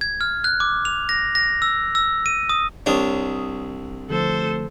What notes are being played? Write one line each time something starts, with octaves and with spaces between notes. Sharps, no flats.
G#6
F6
F#6
D6
F7
A#6
A#6
E6
E6
D#7
D#6
C2 D4 C#5 D#6
D3 F3 A3 A4 C5